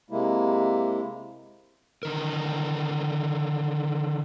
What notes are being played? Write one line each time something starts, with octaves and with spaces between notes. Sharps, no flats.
C3 G#3 A#3 E4
D3 D#3 A#4